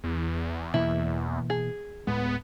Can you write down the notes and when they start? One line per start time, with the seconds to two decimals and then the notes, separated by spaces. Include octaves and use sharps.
0.04 E2
0.74 B2 E3 A#3 E4
1.50 G#4
2.07 D1 A2 G#3 B3